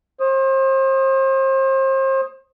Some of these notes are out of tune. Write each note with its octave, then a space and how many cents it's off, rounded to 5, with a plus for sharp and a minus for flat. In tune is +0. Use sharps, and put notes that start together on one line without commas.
C5 +35 D#6 +0